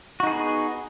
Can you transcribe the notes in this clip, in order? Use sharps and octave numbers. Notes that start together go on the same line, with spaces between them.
B3 D#4 F#4 G#4